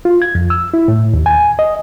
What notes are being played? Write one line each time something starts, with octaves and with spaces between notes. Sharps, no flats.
F4
G#6
F2
E6
E4
A2
D#2
G#5
D#5